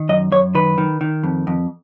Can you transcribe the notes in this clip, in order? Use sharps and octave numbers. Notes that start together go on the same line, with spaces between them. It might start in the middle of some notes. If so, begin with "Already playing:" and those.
Already playing: D#3
F#2 D#5
F#2 C#5
D#3 B4
D#3
D#3
F2
F2